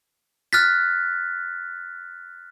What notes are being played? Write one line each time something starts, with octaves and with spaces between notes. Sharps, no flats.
F6 F#6 A6 B6